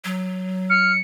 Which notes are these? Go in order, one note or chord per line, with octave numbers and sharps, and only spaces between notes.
F#3
F6 C#7